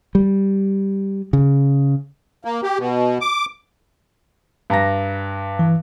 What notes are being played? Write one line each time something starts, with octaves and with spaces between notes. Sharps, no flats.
G3
C#3
A#3
G4
B2
D6
G2 A#5 A#6
E3